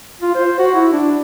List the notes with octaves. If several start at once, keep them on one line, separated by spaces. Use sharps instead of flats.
F4
C5
F#4
E4
D4